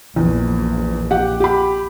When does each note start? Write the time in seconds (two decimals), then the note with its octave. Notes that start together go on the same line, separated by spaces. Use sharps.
0.16 A#1 E2
1.11 G4 F#5
1.40 G4 B5